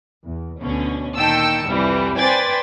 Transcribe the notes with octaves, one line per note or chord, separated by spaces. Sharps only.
E2
D2 B2 D3 C#4
A#2 D#3 G5 A5 E6 C#7
C2 F2 E3 G3
B4 C5 D5 G5 G#5 A6